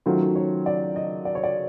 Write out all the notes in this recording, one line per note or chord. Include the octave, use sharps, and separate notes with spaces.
D#3 F#3 A3 C#4 F4 C5
C#5
D5
D#5
D5
C#5
D5